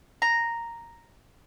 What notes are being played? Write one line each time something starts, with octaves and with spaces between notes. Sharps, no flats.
A#5